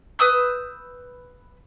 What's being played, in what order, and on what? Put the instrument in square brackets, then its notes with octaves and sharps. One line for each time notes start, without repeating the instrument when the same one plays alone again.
[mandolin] B4 D#6 E6 G6